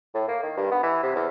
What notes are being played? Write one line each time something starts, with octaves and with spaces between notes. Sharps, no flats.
A2
A#3
D#3
G2
B3
E3
C3
E2